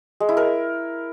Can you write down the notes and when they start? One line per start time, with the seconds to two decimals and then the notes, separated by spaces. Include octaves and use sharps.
0.20 G#3
0.29 E4
0.37 A#4